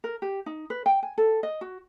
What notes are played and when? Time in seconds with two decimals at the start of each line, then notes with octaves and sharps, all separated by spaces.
0.04 A#4
0.22 G4
0.46 D#4
0.70 B4
0.86 G5
1.03 G#5
1.18 A4
1.43 D#5
1.61 F#4